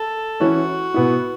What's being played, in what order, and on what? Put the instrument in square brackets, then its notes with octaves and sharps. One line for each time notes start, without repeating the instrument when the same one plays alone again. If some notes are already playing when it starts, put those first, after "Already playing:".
Already playing: [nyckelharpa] A4
[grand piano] E3 C#4 E4 [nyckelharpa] F#4
[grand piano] B2 B3 E4